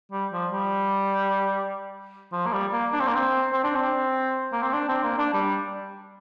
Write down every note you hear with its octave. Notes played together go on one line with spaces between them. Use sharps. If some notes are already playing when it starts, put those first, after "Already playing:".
G3
F3
G3
F3
A#3
G3
A#3
D4
C4
A#3
C4
C4
D4
C4
A#3
C4
D4
C4
A#3
D4
G3